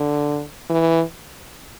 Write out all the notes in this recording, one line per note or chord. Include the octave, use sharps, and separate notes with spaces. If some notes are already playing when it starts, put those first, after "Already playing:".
Already playing: D3
E3